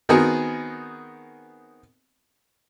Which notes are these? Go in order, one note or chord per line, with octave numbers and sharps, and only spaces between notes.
D#3 B3 C4 F#4 G#4 A#4